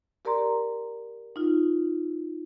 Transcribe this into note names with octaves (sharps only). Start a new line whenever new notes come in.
G4 A#4 D5 A#5 C6
D#4 F4